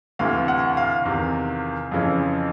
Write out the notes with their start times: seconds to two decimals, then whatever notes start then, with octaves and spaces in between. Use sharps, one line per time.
0.19 D2 C3 E3 F5
0.48 F#5
0.77 F5
1.05 E2 C3 D#3
1.92 F2 C#3 E3